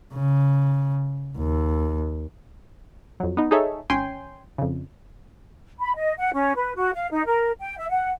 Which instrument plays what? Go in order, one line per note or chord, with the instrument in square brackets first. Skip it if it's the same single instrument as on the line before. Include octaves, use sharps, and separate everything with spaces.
[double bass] C#3
D#2
[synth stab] F2 F#3
B3 D#4
D#4 G#4 A4 C#5 E5
G#1 C#4 G5 G#5 C6
F2 C#3
[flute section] B5
D#5
F#5
C#4
B4
F#4
F5
D#4
A#4
G5
E5
F#5